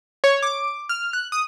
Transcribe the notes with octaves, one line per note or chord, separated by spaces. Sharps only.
C#5
D6
F6
F#6
D#6